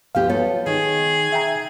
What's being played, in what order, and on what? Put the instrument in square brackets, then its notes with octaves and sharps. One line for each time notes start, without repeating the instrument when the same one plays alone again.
[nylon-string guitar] D2 F3 G4 [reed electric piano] B3 F5
[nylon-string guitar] B3 F4 A4 [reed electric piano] C#5
[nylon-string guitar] D#3 [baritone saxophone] G#4
[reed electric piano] E5 G5 A#5